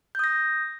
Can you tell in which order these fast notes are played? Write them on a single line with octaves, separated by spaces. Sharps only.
G6 D#6 A#6